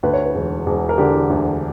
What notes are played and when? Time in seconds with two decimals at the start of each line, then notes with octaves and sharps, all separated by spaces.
0.03 D2 B4
0.14 C#5
0.25 B4
0.35 E1
0.66 E1
0.89 A#4
0.98 D3 G4
1.30 D2